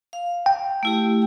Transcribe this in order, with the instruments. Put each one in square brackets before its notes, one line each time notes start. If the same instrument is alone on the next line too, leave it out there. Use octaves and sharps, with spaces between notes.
[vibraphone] F5
[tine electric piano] G5
[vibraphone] A3 E4 G4